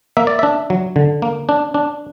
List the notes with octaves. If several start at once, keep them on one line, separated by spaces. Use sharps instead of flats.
A#3 E5
D5
D4 E5
F#3
D3
A#3
D4
D4